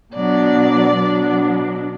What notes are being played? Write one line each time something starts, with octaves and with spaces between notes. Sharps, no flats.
B2 F#3 B3 D4 D5
B2 F#3 B3 D4